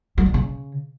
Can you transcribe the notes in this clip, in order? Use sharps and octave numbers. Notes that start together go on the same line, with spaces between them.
F#3
G2
C#3